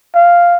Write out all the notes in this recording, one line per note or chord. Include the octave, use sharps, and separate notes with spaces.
F5